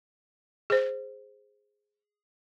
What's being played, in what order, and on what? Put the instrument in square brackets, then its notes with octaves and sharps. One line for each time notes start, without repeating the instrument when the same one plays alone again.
[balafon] G#4 C5